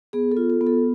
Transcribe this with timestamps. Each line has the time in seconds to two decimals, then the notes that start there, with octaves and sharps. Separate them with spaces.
0.13 B3 G#4
0.32 A4
0.37 F4
0.50 A4
0.61 B3
0.67 A4